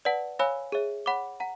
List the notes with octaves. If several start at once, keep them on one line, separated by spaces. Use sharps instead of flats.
B4 D5 F#5 A5
C#5 F5 G#5 B5 E6
G#4 C#5 E5
C#5 F#5 B5 D6
F#5 A#5